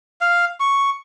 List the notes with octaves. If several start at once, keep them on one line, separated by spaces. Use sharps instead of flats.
F5
C#6